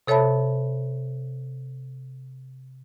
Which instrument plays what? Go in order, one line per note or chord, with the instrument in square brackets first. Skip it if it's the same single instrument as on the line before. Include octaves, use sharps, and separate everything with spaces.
[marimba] C3 A4 C#5 E5 A5 B5